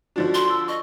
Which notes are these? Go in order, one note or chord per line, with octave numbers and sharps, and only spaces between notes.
D3 F3 D4 F#4
C6
E6
D#5 C#6